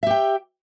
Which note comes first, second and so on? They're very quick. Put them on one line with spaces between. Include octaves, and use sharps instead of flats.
E5 G4 G5